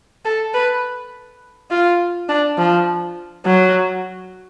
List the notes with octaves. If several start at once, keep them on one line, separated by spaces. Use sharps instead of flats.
A4
B4
F4
D4
F3
F#3